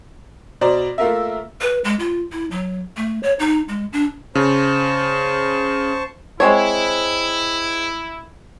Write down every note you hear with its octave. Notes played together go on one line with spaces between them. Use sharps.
B2 C5 D5 A#5
A3 A#3 F4 A#4 E5
B4
G#3
F4
E4
F#3
A3
C#5
D#4
G#3
D4
C#3 C5 A5 C#6
G#3 C4 E4 C#5